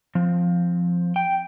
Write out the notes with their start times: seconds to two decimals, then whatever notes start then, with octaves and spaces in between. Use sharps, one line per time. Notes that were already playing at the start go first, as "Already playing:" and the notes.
0.15 F3 C4
1.16 G5